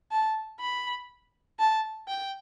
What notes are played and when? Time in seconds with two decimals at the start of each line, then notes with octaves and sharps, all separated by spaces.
0.11 A5
0.60 B5
1.59 A5
2.08 G5